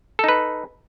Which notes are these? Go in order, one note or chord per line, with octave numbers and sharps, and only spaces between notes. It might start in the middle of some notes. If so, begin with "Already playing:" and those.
D#4 A4 B4